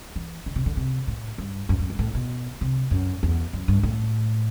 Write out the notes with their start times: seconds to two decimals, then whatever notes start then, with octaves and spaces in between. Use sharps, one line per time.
0.16 E3
0.46 D3
0.56 C3
0.66 D3
0.77 C3
1.07 A2
1.38 G2
1.69 F#2
1.80 F#2
1.90 G2
1.99 A2
2.15 B2
2.61 C3
2.91 F#2
3.23 E2
3.53 F#2
3.68 G2
3.83 A2